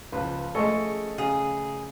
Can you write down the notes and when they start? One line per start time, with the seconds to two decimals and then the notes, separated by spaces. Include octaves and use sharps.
0.12 C#2 F3 B4
0.55 G#3 A3 C#4 A4 D#5 C#6
1.18 C#3 G#4 F5